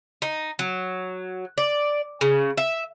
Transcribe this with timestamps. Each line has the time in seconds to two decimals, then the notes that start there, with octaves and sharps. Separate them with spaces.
0.22 D#4
0.59 F#3
1.58 D5
2.21 C#3
2.57 E5